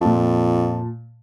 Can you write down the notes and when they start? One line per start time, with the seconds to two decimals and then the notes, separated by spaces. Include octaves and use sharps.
0.01 F2 A#2 A5